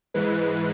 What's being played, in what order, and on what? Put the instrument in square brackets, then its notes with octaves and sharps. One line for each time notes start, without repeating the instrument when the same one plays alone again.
[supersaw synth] G#2 E3 G#3 B4